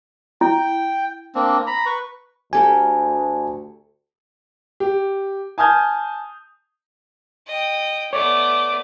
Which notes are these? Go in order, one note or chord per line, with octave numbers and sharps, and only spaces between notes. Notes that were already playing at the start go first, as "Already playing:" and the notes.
E4 G5
A#3 C4 D4
A#5 B5
B4 C#6
D2 G4 A4 A#4 G#5
G4
G#5 A5 D#6 F6 G6 G#6
D#5 G5
A3 B3 C#5 D5 D6